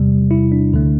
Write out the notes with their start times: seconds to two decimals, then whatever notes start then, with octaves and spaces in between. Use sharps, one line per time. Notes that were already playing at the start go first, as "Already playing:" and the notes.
Already playing: E2 C3 G3
0.31 E4
0.52 D4
0.73 D2 D3 A3